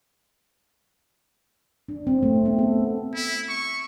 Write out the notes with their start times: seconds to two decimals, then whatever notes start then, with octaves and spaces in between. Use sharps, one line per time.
1.89 D4
2.07 C4
2.23 A3
2.45 B3
2.58 A4
3.15 E4
3.49 C#6